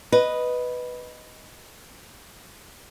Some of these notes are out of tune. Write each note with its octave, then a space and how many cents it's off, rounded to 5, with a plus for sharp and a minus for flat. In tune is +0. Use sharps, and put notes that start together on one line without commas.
B4 +0 D#5 +0